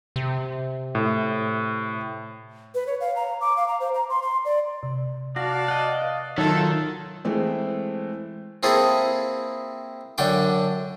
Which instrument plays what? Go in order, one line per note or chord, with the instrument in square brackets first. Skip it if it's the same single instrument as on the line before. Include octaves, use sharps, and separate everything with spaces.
[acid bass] C3
[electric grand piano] A2
[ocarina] B4
C#5
F5
A#5
D6
F5
A#5
C5
A#5
C6
C6
D5
[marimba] C3
[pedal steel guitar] F#4 [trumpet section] D5 F5 A5 [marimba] A#6
[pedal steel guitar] D#5 F#5
[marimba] B4 F5
[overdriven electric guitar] D#3 [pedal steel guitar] F#3 F4 [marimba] D#4 E5 [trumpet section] A4
[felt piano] E3 G#3 A3 C4
[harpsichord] A#3 C4 E4 G#4 A4
F#2 D3 D4 G5 D6